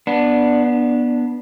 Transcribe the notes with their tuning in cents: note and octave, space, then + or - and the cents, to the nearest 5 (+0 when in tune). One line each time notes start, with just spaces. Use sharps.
B3 -20 D4 +0